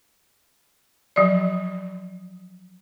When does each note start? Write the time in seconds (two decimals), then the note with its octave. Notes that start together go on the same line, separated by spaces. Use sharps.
1.16 F3 F#3 D5